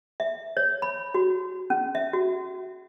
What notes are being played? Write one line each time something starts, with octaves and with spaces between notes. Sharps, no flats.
E5
C#5
B5
F#4
C#4
E5
F#4